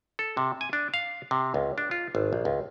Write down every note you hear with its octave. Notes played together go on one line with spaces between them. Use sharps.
A4
C3
G#5
D4
F5
C3
C#2
D4
F4
G#1
A#1
C#2